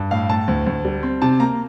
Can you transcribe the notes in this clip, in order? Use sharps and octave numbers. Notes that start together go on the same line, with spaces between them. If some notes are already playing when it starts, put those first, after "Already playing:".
Already playing: G2
A2 F5
A2 A5
D2
D2
G3
C4
C3 A5
A#3 A#5